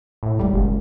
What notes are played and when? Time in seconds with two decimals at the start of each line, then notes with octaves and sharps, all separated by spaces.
0.23 A2
0.39 D#2 G3 G#3
0.53 F#1